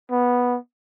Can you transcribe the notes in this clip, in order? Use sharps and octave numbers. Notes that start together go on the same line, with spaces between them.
B3